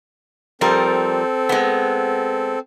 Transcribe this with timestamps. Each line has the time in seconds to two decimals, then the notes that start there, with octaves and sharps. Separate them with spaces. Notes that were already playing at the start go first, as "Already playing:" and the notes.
0.61 F3 G3 C4 A4 A#4
1.49 G#3 B3